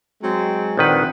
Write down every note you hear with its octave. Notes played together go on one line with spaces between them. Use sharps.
F#3 G#3 C4
A#1 D#3 C4 B4 F#5